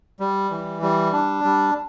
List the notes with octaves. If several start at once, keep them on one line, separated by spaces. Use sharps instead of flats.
G3
E3
G3
D4
G3